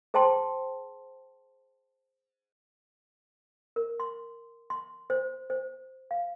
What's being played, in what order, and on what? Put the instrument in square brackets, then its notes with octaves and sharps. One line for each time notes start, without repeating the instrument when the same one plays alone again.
[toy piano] G#4 C5 G5 A5 C6
A#4
C6
C6
C5
C5
F5